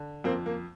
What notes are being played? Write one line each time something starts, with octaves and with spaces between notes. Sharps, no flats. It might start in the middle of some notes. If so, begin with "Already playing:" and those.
Already playing: D3
F2 A#3 C4
A#3